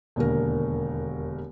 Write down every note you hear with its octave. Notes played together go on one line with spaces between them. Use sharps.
E1 D#2 D3 A#4